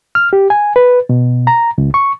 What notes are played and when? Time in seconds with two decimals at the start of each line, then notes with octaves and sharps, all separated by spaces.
0.15 F6
0.33 G4
0.50 G#5
0.76 B4
1.09 B2
1.47 A#5
1.78 C#2
1.94 C#6